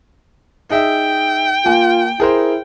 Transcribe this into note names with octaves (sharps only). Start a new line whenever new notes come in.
D#4 G#4 E5 G5
A#3 F4 G#5
E4 G#4 A#4 C5